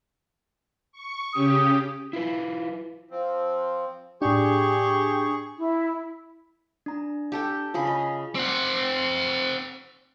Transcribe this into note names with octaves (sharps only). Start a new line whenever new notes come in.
C#6
C#3 C#4 G4 D#6
E4 F4 B4
F3 C4
A2 D4 G4 G#4 C#6
E4
D4 A#5
G4 A4 G5
C#3 F4 G#4 B5
D#5
C4 F#5